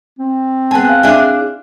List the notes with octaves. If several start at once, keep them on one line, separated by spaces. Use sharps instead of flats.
C4
B3 G#4 G#5 A5
F5 F#6
D4 E4 G#4